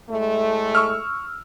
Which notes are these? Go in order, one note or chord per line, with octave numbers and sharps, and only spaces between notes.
A2 G#3 A3
C#6 E6 F6